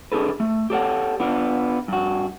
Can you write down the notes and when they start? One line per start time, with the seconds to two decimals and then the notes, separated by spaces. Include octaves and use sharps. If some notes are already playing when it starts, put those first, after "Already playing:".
0.12 D4 D#4 G#4 A4 B4
0.40 A3
0.70 G4 A4 C#5 F#5
1.20 B3 D4 F4
1.88 G2 F#4